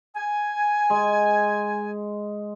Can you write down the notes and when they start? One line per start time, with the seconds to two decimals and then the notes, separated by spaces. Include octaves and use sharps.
0.16 G#5
0.90 G#3